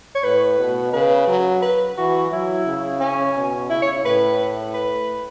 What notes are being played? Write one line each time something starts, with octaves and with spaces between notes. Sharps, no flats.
C#5
A2 B4
B2
C#3 B4
F#3
B4
E3 F#4
F#3 E4
C#3
C#4
B2
C#3 E4
C#5
A2 B4
B4